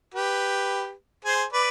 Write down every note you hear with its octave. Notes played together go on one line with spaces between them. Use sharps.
G4 B4
G#4 C5
B4 D5